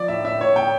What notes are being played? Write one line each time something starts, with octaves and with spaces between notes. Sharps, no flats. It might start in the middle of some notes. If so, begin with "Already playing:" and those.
Already playing: F3 D5
A2 E5
A2 E5
A2 C#5
A2 G5